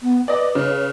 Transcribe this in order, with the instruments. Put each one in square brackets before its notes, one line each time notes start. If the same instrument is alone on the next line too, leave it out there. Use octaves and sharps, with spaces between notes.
[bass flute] B3
[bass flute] B4 [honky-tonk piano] D5 D#5
[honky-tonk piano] C#3